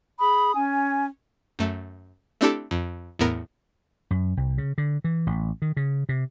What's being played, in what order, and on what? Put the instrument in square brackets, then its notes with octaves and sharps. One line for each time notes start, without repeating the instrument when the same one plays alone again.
[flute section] G#4 B5 D#6
C#4 G#5
[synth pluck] F#2 A3
A3 C4 D4 E4 G4 A4
F2
E2 A2 B3 A#4
[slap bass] F#2
C2
C#3
D3
E3
A1
D#3
C#3
C3